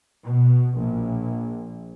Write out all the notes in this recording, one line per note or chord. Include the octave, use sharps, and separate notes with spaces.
B2
A#1